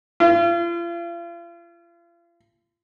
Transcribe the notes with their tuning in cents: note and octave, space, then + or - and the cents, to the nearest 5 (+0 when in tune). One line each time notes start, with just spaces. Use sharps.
F4 -40